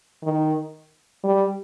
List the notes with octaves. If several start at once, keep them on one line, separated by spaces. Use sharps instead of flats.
D#3
G3